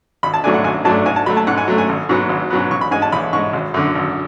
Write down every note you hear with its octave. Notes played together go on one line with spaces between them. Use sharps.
G#1 B5
A5
G#2 F#3 A3 D4 G#5
F#5
G#1 G#5
G#2 F#3 A3 D4 A5
G#2 G#5
A5
F#3 A3 B5
A5
G#2 F#5
G#5
F#3 A3
G#5
G#1
G#2 F#3 B3
G#1
G#2 F#3 B3
A1 C#6
B5
G#2 G#3 G#5
A5
A1 B5
G#2 G#3 C#6
G#1
F#2 D3
G#1